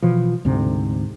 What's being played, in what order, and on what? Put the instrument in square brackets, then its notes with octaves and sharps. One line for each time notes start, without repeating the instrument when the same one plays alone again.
[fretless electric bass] B2 E3 F3
D2 G#2 C3